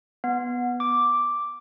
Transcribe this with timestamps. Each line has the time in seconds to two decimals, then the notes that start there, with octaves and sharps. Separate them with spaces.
0.24 B3
0.80 D6